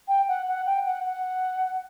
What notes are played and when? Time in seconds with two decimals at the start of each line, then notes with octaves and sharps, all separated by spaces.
0.08 G5
0.28 F#5
0.48 F#5
0.66 G5
0.86 F#5
1.06 F#5